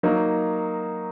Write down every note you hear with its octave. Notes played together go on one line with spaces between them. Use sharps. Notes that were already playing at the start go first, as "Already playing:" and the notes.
F#3 A#3 D#4